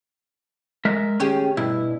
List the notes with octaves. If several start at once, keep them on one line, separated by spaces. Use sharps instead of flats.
G#3 A#4 E5
D#3 C#4 G4 G#4
G2 B2 E4